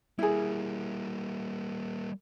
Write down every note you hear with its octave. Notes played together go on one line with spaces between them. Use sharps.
G3 A#3 E4 G#4